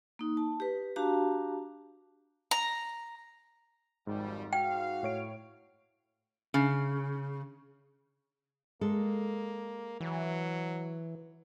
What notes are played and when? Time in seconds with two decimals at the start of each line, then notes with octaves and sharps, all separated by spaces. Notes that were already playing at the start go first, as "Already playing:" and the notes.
0.19 A#3 D#4
0.37 A5
0.60 G4 B4
0.96 D4 F#4 G4 F5 A5 A#5
2.51 A#5
4.07 G#1 F2 G#2 G3
4.53 F#4 F5 G5
5.03 A2 C#5 D7
6.54 C#3
8.81 G#3 A#3 A4
10.01 E3 F#3